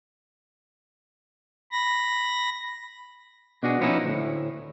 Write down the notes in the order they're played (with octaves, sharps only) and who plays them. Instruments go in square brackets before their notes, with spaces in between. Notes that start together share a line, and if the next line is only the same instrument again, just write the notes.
[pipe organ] B5 A#6
[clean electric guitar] B2 D4 F#4 G#4
A#2 F3 B3 C#4 D#4 E4
D2 A2